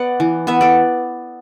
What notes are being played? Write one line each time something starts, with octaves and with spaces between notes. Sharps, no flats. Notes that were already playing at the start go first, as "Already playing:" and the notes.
Already playing: B3 B4 D5 F#5
E3
B3 B4 E5
A4 D5